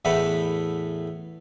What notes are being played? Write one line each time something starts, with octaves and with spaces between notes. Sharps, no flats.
E2 A2 A3 B4 F#5